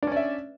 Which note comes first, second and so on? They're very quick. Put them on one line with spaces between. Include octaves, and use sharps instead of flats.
D4 C#4 D5 E5